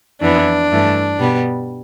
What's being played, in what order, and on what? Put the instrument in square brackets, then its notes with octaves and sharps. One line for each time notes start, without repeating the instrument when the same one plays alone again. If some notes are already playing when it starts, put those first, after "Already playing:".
[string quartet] F2 E3 B3 E4 [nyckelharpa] D4
[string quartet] G2 E3 A3
B2 G3 B3